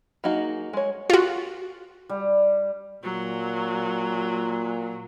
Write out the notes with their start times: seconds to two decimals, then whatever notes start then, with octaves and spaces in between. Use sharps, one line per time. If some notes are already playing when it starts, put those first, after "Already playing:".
0.24 F#3 A#3 D#4 F#4 G#4
0.73 G#3 C#5
1.10 F4 F#4
2.09 G3
3.03 A#2 F#3